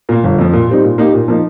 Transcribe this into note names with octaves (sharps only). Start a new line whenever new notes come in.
A#2 A#3
G1
F2 F3
A#2
G3 C4 D#4
A#2
A#3 D#4 G4
A#2
F3 A#3 D#4